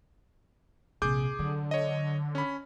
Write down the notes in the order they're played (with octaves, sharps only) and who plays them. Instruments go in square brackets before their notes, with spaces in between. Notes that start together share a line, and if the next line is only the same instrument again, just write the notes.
[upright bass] A#1 C3 [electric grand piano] G#4 D6 G6
[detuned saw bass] D3 [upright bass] F#3
[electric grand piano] C#5 D#5
C#4 B5